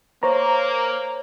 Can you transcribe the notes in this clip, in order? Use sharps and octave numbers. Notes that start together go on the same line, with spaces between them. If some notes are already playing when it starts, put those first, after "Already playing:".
A#3 C5 C#5 A#5